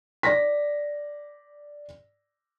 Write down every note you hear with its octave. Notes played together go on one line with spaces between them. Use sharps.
D5 A#6 B6